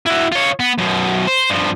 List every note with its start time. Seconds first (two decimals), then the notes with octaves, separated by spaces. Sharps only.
0.06 E4 F#4
0.32 F4 C#5
0.60 B3
0.78 F#2 B2
1.27 C5
1.50 G2 F3